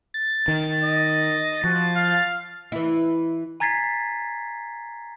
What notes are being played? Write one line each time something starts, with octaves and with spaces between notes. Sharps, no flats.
A6
D#3
D#5
F3 F#4
F5
E3 E4
G#5 A#5 G#6 A6 B6 C7